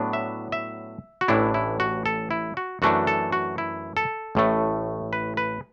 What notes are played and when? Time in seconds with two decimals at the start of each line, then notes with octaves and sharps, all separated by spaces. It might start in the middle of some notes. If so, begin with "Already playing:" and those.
Already playing: A2 F#3 B3 D4
0.13 E5
0.52 E5
1.21 F#4
1.28 A1 A2 E3 D4 E4
1.54 E4
1.80 F#4
2.06 A4
2.31 E4
2.57 F#4
2.82 F#2 E3 A3 D4 F#4
3.07 A4
3.32 F#4
3.58 E4
3.97 A4
4.35 A1 A2 A3
5.13 B4
5.37 B4